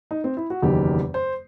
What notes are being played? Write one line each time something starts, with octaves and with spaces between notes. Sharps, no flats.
D#4
C4
E4
F#4
F#1 E2 D#3 F#3 G4
C5